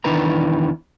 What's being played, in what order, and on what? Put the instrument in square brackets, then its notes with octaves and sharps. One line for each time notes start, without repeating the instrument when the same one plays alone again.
[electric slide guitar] E2 D#3 D4 E4 B4 A#5